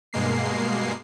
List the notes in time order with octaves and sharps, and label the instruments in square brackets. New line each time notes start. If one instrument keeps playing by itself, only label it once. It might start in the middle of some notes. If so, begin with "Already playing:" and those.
[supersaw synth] G2 B2 G#3 A#3 C7